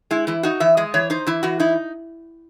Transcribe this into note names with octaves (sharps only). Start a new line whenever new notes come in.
G#3 E4
E3 E4
D#4 F#4
E3 E5
G#3 D#5
E3 C#5
D#4 C5
E3 E4
E3 F#4
D#4 E4